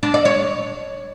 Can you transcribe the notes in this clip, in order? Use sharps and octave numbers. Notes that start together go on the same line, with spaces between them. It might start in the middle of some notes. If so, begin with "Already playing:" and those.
D4
D5
C#5